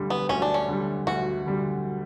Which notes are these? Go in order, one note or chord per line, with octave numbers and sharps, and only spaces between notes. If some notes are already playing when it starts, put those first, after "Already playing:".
Already playing: D2 D3 G3
B3
D2 C#4
D4
C#4
D3 G3
D2 F#4
D3 G3